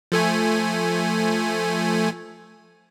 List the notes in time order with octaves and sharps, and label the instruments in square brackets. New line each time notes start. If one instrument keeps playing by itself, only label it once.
[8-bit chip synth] F3 A3 G#5